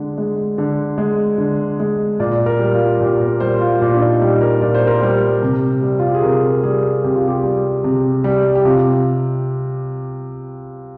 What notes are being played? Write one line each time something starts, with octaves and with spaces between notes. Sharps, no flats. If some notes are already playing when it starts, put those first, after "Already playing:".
Already playing: D3 G#3
G#3
D3
G#3
D3
G#3
A#2 D5
A#4
G3
F4
A#2 G4
A#4
G3 C5
F4
A#2 F4
D4
D#4
G3 G4
A#4
A#2 D5
C5
A#4
G3 C5
C3
G3
F4
G4
G#4
C3 A#4
G3 G#4
C3 G4
F4
G4
G3
C3
G3
G4
C3 F4